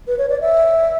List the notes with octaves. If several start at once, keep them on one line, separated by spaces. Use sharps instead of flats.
B4
C#5
D5
E5